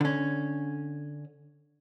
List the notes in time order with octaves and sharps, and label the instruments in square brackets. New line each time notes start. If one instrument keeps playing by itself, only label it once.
[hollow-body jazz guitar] D3 C#4